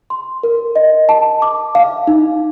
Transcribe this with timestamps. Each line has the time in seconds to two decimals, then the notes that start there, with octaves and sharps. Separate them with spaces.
0.10 C6
0.43 A#4
0.76 D#5
1.09 A5
1.42 D6
1.75 F5
2.07 D#4